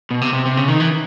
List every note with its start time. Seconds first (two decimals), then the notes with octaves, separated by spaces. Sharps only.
0.11 B2
0.21 C3
0.33 C3
0.46 C3
0.57 C#3
0.68 D#3
0.80 E3